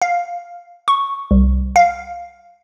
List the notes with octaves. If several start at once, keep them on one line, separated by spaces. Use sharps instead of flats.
F5
C#6
C2
F5